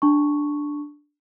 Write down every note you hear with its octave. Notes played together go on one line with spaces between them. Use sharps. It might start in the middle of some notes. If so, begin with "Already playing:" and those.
D4 A5 C#6